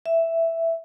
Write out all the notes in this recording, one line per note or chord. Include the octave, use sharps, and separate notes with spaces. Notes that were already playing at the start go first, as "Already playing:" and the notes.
E5